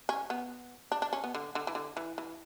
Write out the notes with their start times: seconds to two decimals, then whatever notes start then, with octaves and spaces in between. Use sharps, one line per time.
0.09 C#4
0.30 B3
0.92 D4
1.02 D4
1.13 C#4
1.24 B3
1.34 D3
1.55 D3
1.67 E3
1.75 D3
1.97 E3
2.18 E3